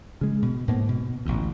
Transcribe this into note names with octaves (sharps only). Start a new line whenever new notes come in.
C#3 G#3
B2
D2 G#2 A#3 B3
B2
A1 D2